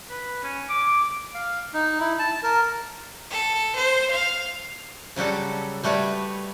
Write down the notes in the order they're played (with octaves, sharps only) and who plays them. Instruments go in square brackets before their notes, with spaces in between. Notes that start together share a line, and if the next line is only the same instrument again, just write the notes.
[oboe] B4
C#4
D6
[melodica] F5
D#4
E4
A5
A#4
[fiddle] A4
C5
F5
[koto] C#3 F#3 G3 F#4 A4
G3 A3 F#4 B4 C#5